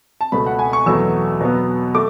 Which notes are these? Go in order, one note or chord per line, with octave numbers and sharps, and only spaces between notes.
A5
C#2 B2 A3 B5
F#5
G#5
C#6
E2 B2 F#3 A3 E6
B2 F#3 B3
A3 D6